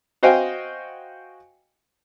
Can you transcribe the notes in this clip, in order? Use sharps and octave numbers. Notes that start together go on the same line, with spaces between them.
F#4 C5 D#5 F5 G5 G#5